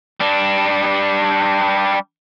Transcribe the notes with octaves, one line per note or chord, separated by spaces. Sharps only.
G3 D4